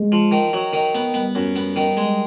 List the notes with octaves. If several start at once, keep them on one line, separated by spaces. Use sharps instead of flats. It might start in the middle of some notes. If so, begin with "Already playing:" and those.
Already playing: G#3
F3
D#3
F#3
D#3
B3
G3 B3
F#2
B3
D#3
G#3